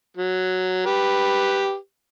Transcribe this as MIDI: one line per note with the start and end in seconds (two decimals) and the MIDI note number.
0.17 0.81 54
0.86 1.75 67
0.86 1.75 71